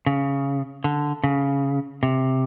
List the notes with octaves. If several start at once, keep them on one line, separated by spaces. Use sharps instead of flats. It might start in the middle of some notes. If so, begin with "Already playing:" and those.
C#3
D3
C#3
C3